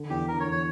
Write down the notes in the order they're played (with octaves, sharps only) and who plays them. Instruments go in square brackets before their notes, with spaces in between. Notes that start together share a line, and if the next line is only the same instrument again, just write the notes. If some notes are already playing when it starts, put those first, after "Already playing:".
Already playing: [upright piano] D3
[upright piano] E2 [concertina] G4
[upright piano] D3 [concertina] A#4
[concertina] C#5
[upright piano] E2
[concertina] C#5